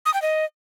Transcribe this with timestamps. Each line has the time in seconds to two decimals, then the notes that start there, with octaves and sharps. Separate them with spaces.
0.06 D#6
0.14 G5
0.22 D#5